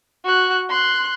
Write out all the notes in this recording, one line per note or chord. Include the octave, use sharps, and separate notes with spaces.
F#4 F#6
C6 F#6